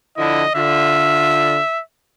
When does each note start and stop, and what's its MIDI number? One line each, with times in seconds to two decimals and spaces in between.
0.17 0.43 50
0.17 0.43 53
0.17 0.43 64
0.17 0.53 75
0.55 1.58 50
0.55 1.58 65
0.55 1.82 76